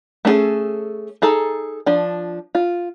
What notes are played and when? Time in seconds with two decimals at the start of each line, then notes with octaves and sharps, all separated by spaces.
0.25 A3 C#4 E4 G#4 A4
1.22 D#4 G#4 A4 A#5
1.86 F3 D4
2.55 F4